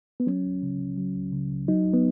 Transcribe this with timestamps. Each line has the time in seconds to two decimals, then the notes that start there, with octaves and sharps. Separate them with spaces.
0.20 B3
0.26 F#3 C#4
0.45 C#2
0.62 C#3
0.80 C#2
0.98 F#3
1.16 C#2
1.32 C#3
1.51 C#2
1.68 F#3 D#4
1.85 C#2
1.93 B3